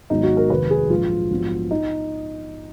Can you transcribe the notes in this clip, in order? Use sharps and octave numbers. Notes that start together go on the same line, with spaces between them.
G#1 G#2 F#3 B3 D#4
F#4
A#4
F1 D#2 D#3 G#3 B4
G#4
A#1 G#2 F#3 F4
A#1 G#2 F#3 B3
D#4